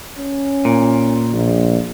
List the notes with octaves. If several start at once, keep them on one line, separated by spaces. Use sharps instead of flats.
C#4
A#2
A#1